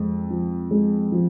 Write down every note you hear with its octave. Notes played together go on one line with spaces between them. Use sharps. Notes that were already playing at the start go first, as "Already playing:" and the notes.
Already playing: F2 G#3
F3
G#3
F3